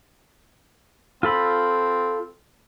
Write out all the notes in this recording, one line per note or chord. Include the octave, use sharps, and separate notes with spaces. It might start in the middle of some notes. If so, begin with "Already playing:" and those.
C4 F4 A4 B5